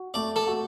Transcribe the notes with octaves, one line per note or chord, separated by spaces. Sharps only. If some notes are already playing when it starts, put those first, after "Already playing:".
Already playing: F#4
A3 D5
A4
F#4